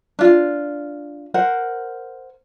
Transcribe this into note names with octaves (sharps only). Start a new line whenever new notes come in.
D4 F4
A#4 C5 F#5